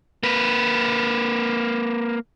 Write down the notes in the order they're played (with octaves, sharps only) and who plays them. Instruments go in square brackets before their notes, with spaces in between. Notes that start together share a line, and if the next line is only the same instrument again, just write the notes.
[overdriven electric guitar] A#3 B4